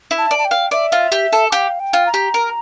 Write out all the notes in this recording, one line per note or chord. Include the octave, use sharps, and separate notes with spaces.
E4
A5
D5
A5
G5
F5
D5 E5
F4
G4
A4
G4 F5
G5
F4
A#5
G4
A#4